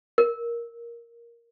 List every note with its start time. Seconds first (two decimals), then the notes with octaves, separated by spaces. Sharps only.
0.18 A#4